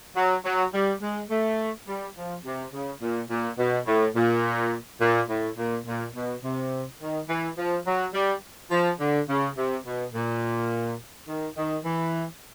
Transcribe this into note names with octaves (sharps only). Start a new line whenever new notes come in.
F#3
F#3
G3
G#3
A3
G3
F3
C3
C#3
A#2
A#2
B2
A2
A#2
A#2
A2
A#2
A#2
B2
C3
D#3
E3
F3
F#3
G3
F3
D3
C#3
C3
B2
A#2
D#3
D#3
E3